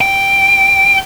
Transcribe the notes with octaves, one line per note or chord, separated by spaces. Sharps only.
G5